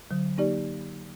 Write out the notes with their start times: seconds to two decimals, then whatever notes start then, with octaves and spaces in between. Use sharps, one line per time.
0.11 D3 F#3
0.38 A#3 D#4 G4 D5